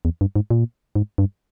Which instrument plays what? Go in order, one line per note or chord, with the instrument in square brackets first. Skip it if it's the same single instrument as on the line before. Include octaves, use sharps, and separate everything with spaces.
[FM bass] E2
G2
G#2
A#2
G#2
G2